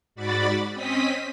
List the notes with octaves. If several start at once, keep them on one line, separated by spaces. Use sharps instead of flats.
G#2 F#4 D5 B5 A6
C4 C#4 D#5 D#6 B6